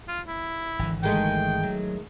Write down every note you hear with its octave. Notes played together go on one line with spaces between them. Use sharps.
F4
E4
G#1 D3 E3
D#3 G#3 A3 G5
F#3